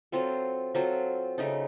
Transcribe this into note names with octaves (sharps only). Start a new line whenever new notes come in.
F#3 C4 F4 A4
F#3 C4 F4 A4
C#3 A3 D#4 A4